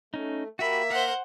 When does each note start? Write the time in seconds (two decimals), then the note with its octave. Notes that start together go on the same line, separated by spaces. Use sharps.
0.14 A3 C#4 D#4
0.59 A#3 F#4 G4 E5 B5
0.90 A#4 C5 F5 F#5